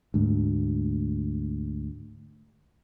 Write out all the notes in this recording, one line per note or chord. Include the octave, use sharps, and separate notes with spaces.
D2 G#2 A3